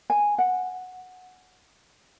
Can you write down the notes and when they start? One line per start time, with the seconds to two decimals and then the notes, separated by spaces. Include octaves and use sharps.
0.10 G#5
0.38 F#5